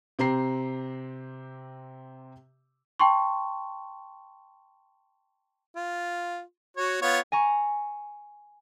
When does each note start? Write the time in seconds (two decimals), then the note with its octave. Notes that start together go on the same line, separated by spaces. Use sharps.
0.19 C3 C4 G4 A#5 C7
3.00 G5 A5 C6 C#6
5.76 F4
6.77 F#4 C#5
7.02 B3 F4 C#5
7.32 G#5 A#5 C#6